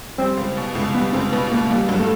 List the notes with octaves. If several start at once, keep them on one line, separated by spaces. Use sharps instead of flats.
G3 C4
C#2
B2
C#2
G3 B3
C#2 C4
B2 B3
C#2 A#3
A3
G3 A#3
G2 F#3
A3